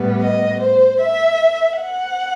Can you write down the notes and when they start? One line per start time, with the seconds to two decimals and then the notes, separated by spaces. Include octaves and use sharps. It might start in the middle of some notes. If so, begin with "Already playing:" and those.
Already playing: A2 G3 B3
0.22 D#5
0.61 C5
1.01 E5
1.81 F#5